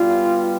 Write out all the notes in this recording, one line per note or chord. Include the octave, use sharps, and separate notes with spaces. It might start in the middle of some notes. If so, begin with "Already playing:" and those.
Already playing: B2 G3 B3 F4